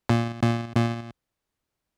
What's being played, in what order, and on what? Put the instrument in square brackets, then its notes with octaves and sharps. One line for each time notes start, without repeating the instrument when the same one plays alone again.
[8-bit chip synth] A#2
A#2
A#2